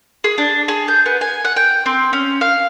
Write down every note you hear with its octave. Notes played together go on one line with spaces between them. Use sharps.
G#4
D4
G#4
G6
B3
G#5
F#5
G5
C4
C#4
F5